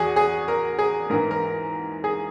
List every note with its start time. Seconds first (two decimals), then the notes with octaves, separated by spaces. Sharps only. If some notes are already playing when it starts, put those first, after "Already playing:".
Already playing: E2 F#4 G#4
0.16 G#4
0.48 A#4
0.79 G#4
1.10 G#2 E3 A#4
1.31 A#4
2.04 G#4